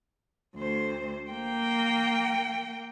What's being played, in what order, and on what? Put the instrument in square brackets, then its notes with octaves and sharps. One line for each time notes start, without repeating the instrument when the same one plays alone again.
[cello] D2 C5
A#3 G5